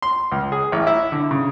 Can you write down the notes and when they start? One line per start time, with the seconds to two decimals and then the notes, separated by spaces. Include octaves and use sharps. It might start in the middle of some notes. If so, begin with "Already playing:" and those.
0.02 C6
0.32 C#2
0.52 G#4
0.72 A1
0.87 E4
1.12 D3
1.31 C#3